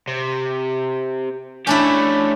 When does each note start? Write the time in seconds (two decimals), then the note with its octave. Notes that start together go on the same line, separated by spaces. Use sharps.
0.08 C3
1.67 A3 C#4 D4 E4 G4